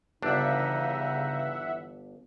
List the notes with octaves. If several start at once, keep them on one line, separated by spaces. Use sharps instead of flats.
G1 C#3 E3 D4 D#4 E5 F#5